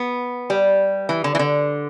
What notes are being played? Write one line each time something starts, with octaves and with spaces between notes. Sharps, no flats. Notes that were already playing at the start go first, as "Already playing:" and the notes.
Already playing: B3
G3
E3
D3
E3
D3